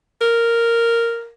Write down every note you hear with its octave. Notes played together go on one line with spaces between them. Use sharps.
A#4